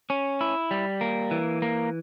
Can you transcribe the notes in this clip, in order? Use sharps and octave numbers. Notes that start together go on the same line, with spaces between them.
C#4
E4
G3
A#3
E3
A#3